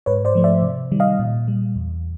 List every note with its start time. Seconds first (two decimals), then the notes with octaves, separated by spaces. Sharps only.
0.06 G#2 B4 C#5
0.25 C5 D5
0.35 F3 A3
0.44 D5 E5
0.62 C3
0.92 D#3 G3
1.00 D#5 F5
1.19 A#2
1.48 G3
1.76 E2